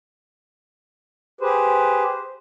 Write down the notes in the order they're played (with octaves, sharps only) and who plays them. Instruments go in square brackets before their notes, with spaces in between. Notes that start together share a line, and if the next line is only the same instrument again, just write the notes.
[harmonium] G4 G#4 B4 [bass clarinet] C5